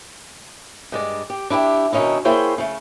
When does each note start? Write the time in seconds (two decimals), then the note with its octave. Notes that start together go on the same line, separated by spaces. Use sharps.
0.92 G2 G#3 D5
1.30 G4
1.50 D4 E4 F#4 G4
1.92 B2 D#3 C#4 D#4 E4
2.25 A#3 E4 G#4 C5 C#5 G5
2.58 C#3 A3